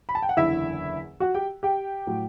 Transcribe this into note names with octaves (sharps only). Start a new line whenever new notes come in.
B5
A5
G5
F#5
F#1 E2 D3 E4 E5
F#4 F#5
G4 G5
G4 G5
A2 F#3